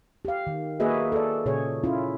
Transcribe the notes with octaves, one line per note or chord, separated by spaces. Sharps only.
G4 F5
D#3
A#3 F#4 G#4 B4 D#5 E5
A4 D5
A#2 C#3 G#4 C#5
C#4 E4 F4